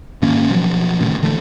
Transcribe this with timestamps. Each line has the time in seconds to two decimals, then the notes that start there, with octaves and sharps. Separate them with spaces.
0.22 G#2 D#3 A#3 C#4
0.50 B2 F3 F#3
1.00 D#1 D#2 A2 C#3
1.22 D3 E3 A3